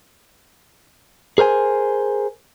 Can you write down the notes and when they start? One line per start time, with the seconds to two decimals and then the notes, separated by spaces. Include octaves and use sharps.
1.38 G#4 A#4 C5 G#5